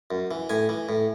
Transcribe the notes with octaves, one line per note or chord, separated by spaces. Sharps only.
F#2
E3
A2 G#5
E3
A2